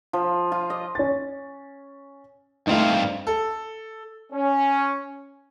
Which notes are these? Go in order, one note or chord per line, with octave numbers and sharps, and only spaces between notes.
F3
F4
D#5
C#4 A6
G2 A3 C4 D#4 F5
A4
C#4